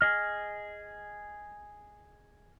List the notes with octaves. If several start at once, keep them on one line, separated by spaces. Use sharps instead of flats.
G#4 D#5 F6